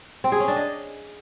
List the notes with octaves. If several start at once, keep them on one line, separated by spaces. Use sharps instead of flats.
C4
G#4
C#4
D4
D#5